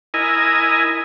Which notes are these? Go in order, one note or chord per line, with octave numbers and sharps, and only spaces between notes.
E4 A#4 D#5 G#5